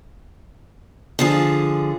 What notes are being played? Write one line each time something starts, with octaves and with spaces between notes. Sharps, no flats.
D3 F3 G#4